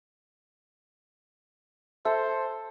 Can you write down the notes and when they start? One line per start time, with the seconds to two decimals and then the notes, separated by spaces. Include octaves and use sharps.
2.05 A4 C5 E5